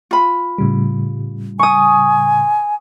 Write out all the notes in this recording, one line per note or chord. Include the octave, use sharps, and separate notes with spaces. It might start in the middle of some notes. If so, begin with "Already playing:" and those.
F4 B5
A2 C#3 G3
G#5 C#6 D#6